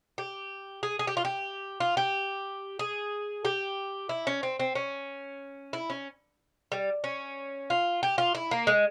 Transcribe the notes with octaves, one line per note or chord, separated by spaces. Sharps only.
G4
G#4
G#4
G4
F4
G4
F4
G4
G#4
G4
E4
C#4
C4
C4
C#4
E4
C#4
G3
C#4
F4
G4
F4
E4
A#3
G#3